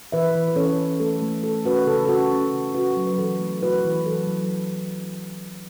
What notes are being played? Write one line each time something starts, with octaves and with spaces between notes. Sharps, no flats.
E3 B4 E5
E3
B4
C#4 A4 C#5
C#4
A3 A4
A3
A3 A4
C#4 F#4 B4
C#3 A4
A4
C#4 F#4
C#4
C#3
C#4 F#4 B4
F#3
B4
E3 A4
A3
E4 F#4 B4
E3
F#3 A4
F#3